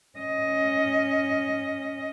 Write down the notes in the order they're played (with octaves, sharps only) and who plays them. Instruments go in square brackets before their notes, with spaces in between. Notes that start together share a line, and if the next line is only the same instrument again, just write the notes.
[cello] C#4 D#5